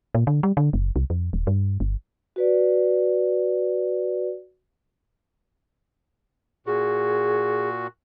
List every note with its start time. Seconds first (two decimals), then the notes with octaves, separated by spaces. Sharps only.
0.15 A#2
0.27 D3
0.43 G3
0.57 D3
0.73 F#1
0.96 C2
1.10 F2
1.33 D#1
1.47 G2
1.80 G1
2.36 F#4 B4 D5
6.67 A#2 F#4 G#4